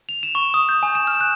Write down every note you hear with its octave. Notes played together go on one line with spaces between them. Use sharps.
F7
E7
C#6
D#6
G6
G#5
E7
F6
F#6